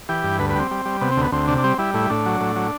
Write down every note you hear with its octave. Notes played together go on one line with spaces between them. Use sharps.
E3 G4
G2
D2 B4
B4
G3 C4
G3
G3
C3 B3
C4
D2 B3
D2 C4
C3 D4
D4
G3 C4
G3 E4
A2 E4
A2 D4
F#3
A2
F#3